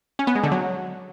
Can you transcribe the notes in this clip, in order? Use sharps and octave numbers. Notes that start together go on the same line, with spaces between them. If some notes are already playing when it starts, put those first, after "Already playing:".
C#4
B3
G#3
D3
F#3